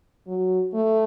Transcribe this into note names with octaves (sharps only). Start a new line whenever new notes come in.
F#3
A3